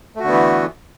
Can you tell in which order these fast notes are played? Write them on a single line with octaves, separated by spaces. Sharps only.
A3 F#4 D3 B3 E3